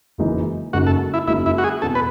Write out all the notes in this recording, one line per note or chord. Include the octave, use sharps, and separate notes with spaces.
F#1 F#2 E3 G#3 D#4
F#1 F#2 C#3 G#3 D#4 F#4
A4
E4
F#1 F#2 C#3 G#3 D#4 E4
E4
F#4
G#4
E1 E2 B2 A4
B4